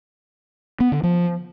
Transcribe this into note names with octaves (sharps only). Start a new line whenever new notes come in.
B3
D3
F3